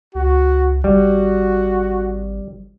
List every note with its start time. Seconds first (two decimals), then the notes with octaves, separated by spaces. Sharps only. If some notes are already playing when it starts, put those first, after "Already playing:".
0.15 C#2 F#4
0.84 G#1 G3 F#4